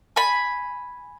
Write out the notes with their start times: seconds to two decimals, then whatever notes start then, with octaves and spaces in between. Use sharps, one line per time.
0.16 G#5 B5